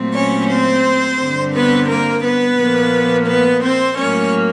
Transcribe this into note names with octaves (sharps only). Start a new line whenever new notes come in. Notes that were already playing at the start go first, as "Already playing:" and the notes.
Already playing: A#2 F#3 A3 C4
C#4 C#5
C4 C5
G2 D3 G3 C4
B3 B4
A#3 A#4
B3 B4
A#2 F3 A#3
B3 B4
C4 C5
A2 F#3 A#3 C#4 C#5